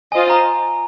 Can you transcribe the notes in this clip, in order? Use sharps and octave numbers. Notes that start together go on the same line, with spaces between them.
F4 C5 D#5 G#5
A#5